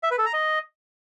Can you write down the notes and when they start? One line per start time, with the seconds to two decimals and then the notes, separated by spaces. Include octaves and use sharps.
0.03 E5
0.11 B4
0.18 A4
0.26 A#5
0.33 D#5